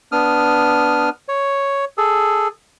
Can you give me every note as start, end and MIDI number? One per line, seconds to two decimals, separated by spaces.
0.12 1.09 59
0.12 1.09 62
0.12 1.09 87
0.12 1.09 89
1.29 1.85 73
1.98 2.48 68
1.98 2.48 69